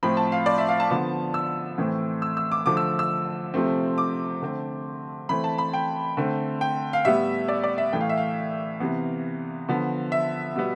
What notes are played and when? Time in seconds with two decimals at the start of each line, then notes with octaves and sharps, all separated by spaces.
0.03 A2 F3 C4 B5
0.17 A5
0.32 F5
0.46 D5
0.58 E5
0.69 F5
0.80 A5
0.90 D3 F3 B3
1.34 E6
1.78 A2 E3 A3 C4
2.22 E6
2.37 E6
2.52 D6
2.66 D3 F3 A3 D6
2.77 E6
2.99 E6
3.54 C3 F3 A3 C4
3.98 D6
4.42 D3 A3 C4
5.29 E3 A3 C4 B5
5.44 A5
5.58 B5
5.74 G5
6.17 D3 A3 C4
6.61 G5
6.93 F5
7.05 A2 G3 B3 E5
7.48 D5
7.64 D5
7.78 E5
7.93 A2 E3 A3 G5
8.01 F5
8.09 E5
8.18 F5
8.80 C3 E3 B3
9.69 D3 F3 B3
10.12 E5
10.56 B2 G3 B3